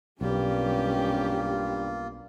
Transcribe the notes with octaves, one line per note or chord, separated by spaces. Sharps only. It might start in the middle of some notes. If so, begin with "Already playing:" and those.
B1 G2 G3 A#3 C#4 F4 G4